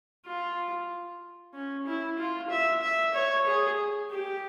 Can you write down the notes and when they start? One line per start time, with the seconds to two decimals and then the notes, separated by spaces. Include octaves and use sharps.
0.26 F4
1.54 C#4
1.87 E4
2.18 F4
2.50 E5
2.82 E5
3.14 C#5
3.47 G#4
4.11 G4